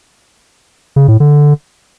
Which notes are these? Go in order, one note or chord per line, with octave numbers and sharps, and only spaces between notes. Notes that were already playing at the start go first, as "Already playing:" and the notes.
C#3
A2
D3